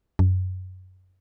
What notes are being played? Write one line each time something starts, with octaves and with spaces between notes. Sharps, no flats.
F#2